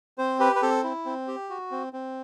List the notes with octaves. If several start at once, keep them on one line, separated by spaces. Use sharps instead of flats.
C4 C5
G4 B4
B4
C4 A4
E4
C4
G4
F#4
C4
C4